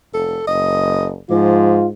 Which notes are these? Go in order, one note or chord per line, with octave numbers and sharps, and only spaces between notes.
F1 A4
F#1 D#5
G#2 F3 F4